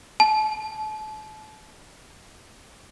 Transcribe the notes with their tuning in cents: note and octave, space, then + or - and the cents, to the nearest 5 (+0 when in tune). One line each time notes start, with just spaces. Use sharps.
A5 -35